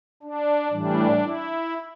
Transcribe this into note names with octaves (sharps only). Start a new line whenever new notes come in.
D4
A2 E3 G3 D4
E4